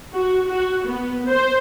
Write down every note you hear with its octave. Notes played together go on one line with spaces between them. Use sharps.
F#4
F#4
B3
C5